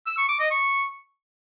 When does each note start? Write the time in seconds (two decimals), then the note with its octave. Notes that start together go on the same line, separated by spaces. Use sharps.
0.06 E6
0.18 C#6
0.29 D6
0.40 D#5
0.51 C#6